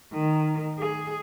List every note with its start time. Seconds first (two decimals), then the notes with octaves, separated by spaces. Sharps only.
0.14 D#3
0.79 G#4